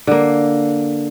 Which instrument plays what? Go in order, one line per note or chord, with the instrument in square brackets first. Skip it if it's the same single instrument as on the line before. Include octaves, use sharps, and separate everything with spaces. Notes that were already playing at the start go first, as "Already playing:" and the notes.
[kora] D3 A#3